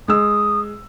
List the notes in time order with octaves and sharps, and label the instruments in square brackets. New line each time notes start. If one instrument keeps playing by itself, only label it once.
[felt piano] G#3 E6 [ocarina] D#6